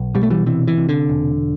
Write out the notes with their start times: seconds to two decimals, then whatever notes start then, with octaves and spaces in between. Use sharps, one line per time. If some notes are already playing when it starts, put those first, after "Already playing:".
Already playing: B1
0.15 B2 G3
0.23 A3
0.30 E3 G3
0.46 C3 E3
0.67 E3
0.77 C3
0.89 D3
1.09 E1